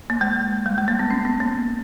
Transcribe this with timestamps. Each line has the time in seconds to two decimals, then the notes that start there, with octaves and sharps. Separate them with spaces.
0.10 A#3
0.21 G#3
0.66 G3
0.78 G#3
0.88 A#3
0.99 B3
1.10 C#4
1.25 B3
1.40 A#3